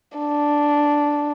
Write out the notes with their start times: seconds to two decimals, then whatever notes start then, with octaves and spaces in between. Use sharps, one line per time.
0.18 D4